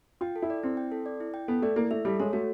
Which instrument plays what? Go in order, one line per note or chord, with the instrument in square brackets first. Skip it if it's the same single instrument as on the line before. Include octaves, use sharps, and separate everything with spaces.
[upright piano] F4 [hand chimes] G5
[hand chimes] A4
[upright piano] E4
[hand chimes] D5
[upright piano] C4 [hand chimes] E4
[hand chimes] G5
A4
D5
E4
G5
[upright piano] B3 [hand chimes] A4
[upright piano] A3 [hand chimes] D5
[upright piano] A#3 [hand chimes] E4
[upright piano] A3 [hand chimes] E5
[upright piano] G3 [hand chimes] A4
[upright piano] G#3 [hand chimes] C#5
[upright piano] A3 [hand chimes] F#4